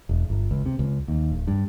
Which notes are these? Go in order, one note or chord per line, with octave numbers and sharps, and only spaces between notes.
E1
G1
C#2
C3
C#2
D#2
D1
G2